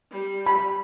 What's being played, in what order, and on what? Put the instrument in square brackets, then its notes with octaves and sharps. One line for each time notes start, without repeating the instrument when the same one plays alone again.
[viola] G3
[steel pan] B5